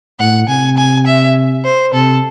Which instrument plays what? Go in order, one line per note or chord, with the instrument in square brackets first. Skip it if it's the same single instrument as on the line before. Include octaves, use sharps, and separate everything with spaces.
[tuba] A2 [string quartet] F#5
[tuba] C3 [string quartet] G#5
[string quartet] G#5
E5
C5
[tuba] C3 [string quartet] A4